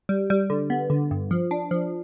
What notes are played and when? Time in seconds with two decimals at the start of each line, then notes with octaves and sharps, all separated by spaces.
0.09 G3
0.30 G3
0.50 D3
0.70 B3
0.90 D3
1.11 G2
1.31 F3
1.51 D4
1.71 F3